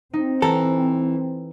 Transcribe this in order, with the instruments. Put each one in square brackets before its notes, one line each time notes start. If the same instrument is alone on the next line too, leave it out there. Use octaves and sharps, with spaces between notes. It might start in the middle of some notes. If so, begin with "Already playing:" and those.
[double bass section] C4 [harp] D#4
[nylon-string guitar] E3 [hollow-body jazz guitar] A4 [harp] A#5